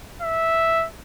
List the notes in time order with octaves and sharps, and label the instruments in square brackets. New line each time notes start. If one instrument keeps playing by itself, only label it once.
[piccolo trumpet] E5